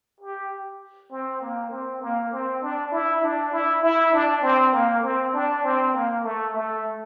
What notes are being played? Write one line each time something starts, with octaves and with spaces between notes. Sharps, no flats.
G4
C4
A#3
C4
A#3
C4
D4
E4
D4
E4
E4
D4
C4
A#3
C4
D4
C4
A#3
A3
A3